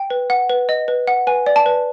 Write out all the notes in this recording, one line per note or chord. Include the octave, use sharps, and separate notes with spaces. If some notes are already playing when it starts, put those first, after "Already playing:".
Already playing: G5
B4
F#5
B4
D#5
B4
F#5
B4 G#5
D5
A5
B4